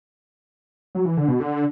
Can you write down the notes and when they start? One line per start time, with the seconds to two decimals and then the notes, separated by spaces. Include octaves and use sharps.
0.95 F#3
1.05 E3
1.17 D3
1.28 B2
1.40 D3